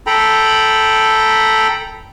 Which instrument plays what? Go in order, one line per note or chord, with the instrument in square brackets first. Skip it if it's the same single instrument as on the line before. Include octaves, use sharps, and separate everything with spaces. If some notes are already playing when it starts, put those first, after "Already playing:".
[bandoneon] A4 G5 A#5 B5